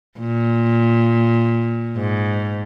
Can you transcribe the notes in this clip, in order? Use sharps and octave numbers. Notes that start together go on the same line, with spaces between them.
A#2
G#2